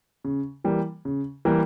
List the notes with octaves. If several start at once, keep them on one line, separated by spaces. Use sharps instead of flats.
C#3
E3 G3 A#3
C#3
E3 G3 A#3